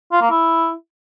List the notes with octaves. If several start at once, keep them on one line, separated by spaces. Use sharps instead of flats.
F4
A#3
E4